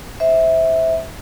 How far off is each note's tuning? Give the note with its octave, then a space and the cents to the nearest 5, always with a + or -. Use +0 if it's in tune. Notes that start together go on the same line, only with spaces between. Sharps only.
C5 +0 E5 -15